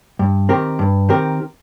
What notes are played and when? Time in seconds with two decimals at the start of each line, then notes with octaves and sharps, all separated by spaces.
0.19 G2
0.49 D#3 C4 G4 A#4
0.79 G2
1.09 D#3 C4 G4 A#4